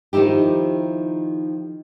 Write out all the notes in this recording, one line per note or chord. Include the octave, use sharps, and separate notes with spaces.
D#3 F3 D#4 E4 G4